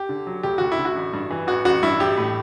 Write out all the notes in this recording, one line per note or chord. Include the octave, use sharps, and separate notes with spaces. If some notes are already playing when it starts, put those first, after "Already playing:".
Already playing: G4
D3
F#3
D2 G4
D2 F#4
E4
D3
F#4
A1
G2
E3
A1 F#4
A1 F#4
G2 E4
A1 G4
A2